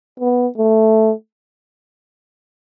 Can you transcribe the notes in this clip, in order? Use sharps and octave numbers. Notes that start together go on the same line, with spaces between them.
B3
A3